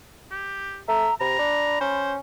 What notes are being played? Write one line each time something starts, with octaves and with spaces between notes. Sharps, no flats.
G4
A3 E5 A#5
C3 A#5 B5
D4
C#4 C5